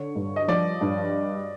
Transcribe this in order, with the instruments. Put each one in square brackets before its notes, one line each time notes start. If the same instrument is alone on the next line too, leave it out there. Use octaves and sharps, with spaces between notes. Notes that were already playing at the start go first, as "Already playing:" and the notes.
Already playing: [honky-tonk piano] D3 [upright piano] C#5
[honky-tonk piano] G2
[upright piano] D#5
[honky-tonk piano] F3 [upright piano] D5
[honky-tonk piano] G2